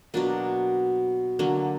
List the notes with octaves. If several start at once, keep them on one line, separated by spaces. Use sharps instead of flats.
B2 F#3 A#3 D4
D3 F#3 A#3